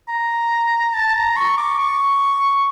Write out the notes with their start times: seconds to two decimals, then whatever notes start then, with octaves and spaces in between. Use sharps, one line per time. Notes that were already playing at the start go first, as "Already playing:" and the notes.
0.08 A#5
0.94 A5
1.15 A#5
1.36 C#6
1.57 D6
1.79 C#6